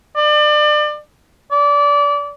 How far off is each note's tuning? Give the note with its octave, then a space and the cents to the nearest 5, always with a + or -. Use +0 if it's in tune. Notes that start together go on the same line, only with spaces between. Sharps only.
D5 +30
D5 -25